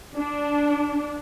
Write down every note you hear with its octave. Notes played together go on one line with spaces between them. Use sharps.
D4